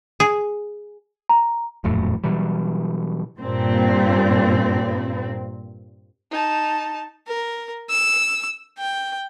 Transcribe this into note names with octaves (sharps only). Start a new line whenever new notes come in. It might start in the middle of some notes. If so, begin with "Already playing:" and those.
G#4
A#5
D#1 F2 A2 F#3
B2 E3 F#3 G3
G2 A#2 C4
D#4 A5
A#4
E6
G5